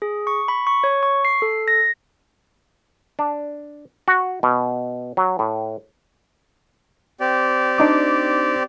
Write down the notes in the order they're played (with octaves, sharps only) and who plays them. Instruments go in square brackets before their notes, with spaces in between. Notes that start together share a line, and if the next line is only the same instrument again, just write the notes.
[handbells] G#4
C#6
B5
C#6
C#5
C#6
C7
A4
A#6
[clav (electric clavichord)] D4
F#4
B2
F#3
A2
[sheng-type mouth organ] C4 G4 D5
[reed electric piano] D4 D#4 D6